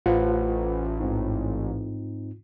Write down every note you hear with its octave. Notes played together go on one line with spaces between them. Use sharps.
A1 F4 B4 C5 F#5
G#2 C4 D#4